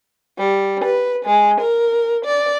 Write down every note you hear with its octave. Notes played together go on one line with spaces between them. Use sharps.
G3
B4
G#3
A#4
D5